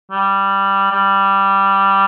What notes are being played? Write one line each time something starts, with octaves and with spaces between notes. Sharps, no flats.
G3
G3